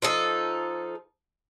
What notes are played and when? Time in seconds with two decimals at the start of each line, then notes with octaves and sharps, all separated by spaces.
0.02 F3 D#4 A4